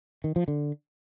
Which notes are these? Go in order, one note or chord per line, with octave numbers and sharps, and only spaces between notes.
D#3
F3
D3